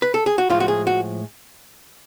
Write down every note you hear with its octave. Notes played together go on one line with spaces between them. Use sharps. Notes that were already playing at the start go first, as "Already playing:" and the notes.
B4
A4
G#4
F#4
A2 F3 G#3 F4
F#4
G#4
F#4